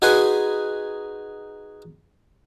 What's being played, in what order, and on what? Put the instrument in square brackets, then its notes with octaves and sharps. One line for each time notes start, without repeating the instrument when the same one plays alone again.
[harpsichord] D#4 F#4 G#4 B4 G#5 C6